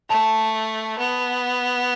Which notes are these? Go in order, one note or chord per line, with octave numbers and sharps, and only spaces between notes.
A3 A5
B3